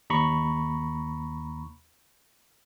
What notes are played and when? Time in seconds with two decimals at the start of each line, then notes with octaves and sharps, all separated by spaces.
0.10 D#2 A#5 B5 C#6